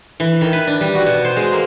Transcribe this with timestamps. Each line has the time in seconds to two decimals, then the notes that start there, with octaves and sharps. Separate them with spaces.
0.20 E3
0.41 D#3
0.53 B4
0.67 D4
0.81 G3
0.95 F#4
1.06 B2
1.25 C5
1.37 G#3
1.52 A#3